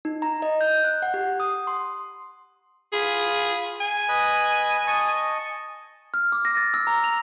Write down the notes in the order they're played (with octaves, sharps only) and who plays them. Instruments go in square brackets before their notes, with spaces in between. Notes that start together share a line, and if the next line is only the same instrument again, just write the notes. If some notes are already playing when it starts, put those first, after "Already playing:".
[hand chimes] D#4
A#5
D#5
G6
F#6
F#5
G4
D#6
C6
[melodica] F4 B5 [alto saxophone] G#4
[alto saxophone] G#5
[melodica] B4 D#5 B5
D#5 A5 C#6
[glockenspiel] F6
D6
A#6
A6
E6
A#5
F7